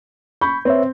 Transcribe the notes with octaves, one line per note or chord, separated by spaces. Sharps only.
B5 C#6 G6
C4 B4 C#5 E5